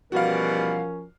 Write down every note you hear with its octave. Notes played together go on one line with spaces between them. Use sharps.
B2 E3 F3 G3 C#4 F#4 A#4 F5